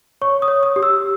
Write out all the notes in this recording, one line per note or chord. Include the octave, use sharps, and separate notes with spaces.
C#5 C#6
D#6
C#5
D#6
G4
E6